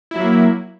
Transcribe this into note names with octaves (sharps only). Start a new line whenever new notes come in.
F#3 A#3 E4